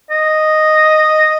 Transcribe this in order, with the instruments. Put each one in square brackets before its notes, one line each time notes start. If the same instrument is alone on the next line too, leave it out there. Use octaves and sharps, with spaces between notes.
[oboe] D#5